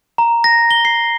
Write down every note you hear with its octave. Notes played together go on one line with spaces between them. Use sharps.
A#5
A#6
G7
C7